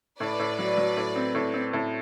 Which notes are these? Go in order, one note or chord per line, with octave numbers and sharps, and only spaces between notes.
A2 B4 D5
A2
F#3
F#3
A2
C4
A2
C4
A2